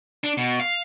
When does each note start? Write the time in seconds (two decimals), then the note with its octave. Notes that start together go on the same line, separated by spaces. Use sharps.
0.24 D4
0.37 B2
0.60 F5